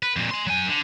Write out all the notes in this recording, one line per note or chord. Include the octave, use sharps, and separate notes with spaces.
B4
F2 A#2
G#5 C6
F#3 G#5
D3